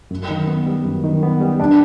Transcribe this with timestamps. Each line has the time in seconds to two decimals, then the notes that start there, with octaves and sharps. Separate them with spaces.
0.11 F#2
0.30 D#3
0.47 B3
0.66 G3
0.85 F#2
1.04 D#3
1.23 B3
1.40 G3
1.60 C3 D4